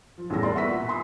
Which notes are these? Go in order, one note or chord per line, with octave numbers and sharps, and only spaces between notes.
F3
A1 E2 G3 A4 A#6
A#4 D5 C6
B3 E5 F#5 C#6 E6 B6
A#2
G#5 C6 D#6 C7